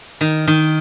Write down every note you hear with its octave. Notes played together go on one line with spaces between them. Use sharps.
D#3
D#3